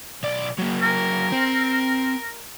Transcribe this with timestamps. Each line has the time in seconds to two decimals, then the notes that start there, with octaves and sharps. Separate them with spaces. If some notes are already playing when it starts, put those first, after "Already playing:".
0.23 B1 D5
0.59 F#3 A#3
0.82 A#4
1.32 C4